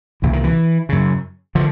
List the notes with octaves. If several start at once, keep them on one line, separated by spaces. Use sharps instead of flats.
C2 A#2 E3
D#3
E3
F#2 C#3
D3 F3